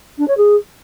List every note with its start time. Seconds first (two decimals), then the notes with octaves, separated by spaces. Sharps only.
0.18 D4
0.28 C#5
0.37 G#4